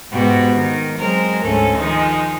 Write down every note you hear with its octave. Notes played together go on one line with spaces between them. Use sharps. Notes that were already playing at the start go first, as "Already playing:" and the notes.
G#2 B2 F#4 G4
D#3
F#3 G#3 C4 A#4
D2 G#2 A3 C#4 A4
D#3 F3 G#3 D#4